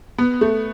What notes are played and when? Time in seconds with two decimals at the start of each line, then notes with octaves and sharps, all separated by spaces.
0.18 B3
0.41 A3